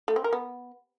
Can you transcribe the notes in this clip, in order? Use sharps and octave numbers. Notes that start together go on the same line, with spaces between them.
A3
C4
A#4
B3